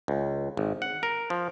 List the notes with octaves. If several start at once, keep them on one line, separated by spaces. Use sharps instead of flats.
C#2
G#1
F#5
A#4
F3